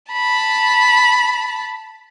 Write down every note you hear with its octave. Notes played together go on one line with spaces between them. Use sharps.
A5 B5